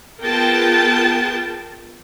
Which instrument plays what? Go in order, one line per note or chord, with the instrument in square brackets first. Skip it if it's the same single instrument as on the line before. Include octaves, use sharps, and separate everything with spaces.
[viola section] B3 F4 G#4 A#4 G5 A5